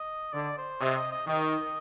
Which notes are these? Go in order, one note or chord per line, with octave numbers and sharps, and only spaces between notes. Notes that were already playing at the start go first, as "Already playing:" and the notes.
Already playing: D#5
D3 D5
C5
C3 D#5
D#5
D#5
D#3 D#5